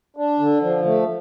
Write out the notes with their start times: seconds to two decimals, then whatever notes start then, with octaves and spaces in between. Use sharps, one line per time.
0.16 D4
0.39 D3
0.62 F3
0.85 A3